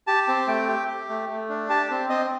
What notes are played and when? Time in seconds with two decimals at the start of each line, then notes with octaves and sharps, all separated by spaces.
0.07 G4 A5
0.28 C4
0.48 A3 G5
0.68 G4
0.88 G4
1.09 A3
1.29 A3
1.49 D4
1.69 G4 A5
1.90 C4
2.10 C4 D#5